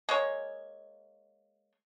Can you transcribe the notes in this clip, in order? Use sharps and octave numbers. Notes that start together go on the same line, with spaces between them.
G#3 A#3 C#5